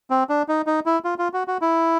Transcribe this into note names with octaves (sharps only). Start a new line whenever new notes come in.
C4
D4
D#4
D#4
E4
F4
F4
F#4
F#4
E4